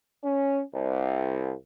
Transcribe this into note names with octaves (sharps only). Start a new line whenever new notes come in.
C#4
C2